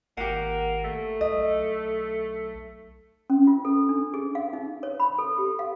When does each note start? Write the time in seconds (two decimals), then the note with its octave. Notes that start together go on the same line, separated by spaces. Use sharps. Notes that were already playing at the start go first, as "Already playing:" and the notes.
0.17 G#1 A#3 G4 F#5
0.84 A3
1.21 C2 D#5
1.38 B1
3.30 C#4
3.47 F4
3.65 A4
3.89 D4
4.14 G#4
4.35 F5
4.53 D#4
4.83 C#5
5.00 B5
5.19 A4
5.38 G4
5.59 F5